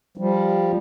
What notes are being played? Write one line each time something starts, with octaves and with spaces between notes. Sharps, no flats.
F3 G3